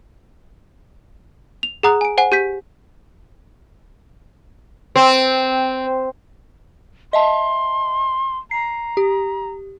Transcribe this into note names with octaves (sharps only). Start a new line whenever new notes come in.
F7
G#4 F#5 A#5 D#6 F#6
G#5 D7
C5 F#5 G#5
G4 G6 B6
C4
D#5 E5 A5 C6
A#5 C7
G4